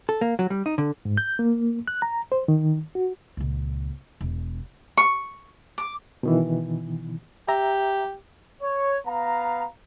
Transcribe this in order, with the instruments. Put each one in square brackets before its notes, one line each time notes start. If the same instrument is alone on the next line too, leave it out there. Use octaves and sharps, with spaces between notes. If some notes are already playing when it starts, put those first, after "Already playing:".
[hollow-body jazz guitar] A4
A#3
F#3
G3
D#4
D3
[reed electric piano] G#2
G6
A#3
F#6
A#5
C5
D#3
F#4
[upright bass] C#2 A#2
E1
[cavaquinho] C#6
D6
[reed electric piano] B2 D#3 E3
[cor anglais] G4 [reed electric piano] E5 A#5
[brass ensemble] C#5
B3 F5 A#5